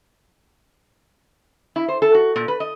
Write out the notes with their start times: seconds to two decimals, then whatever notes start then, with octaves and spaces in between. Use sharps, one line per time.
1.76 E4
1.88 C5
2.02 A4
2.15 F#4
2.36 A#2
2.48 B4
2.60 D#5